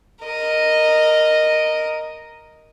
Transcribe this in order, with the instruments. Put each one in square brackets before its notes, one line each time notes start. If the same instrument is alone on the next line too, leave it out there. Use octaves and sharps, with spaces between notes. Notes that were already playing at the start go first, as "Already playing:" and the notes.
[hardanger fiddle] A#4 D#5